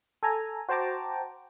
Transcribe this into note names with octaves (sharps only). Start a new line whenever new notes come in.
A4 G#5 A#5
F#4 C5 G5 A5 A#5 D6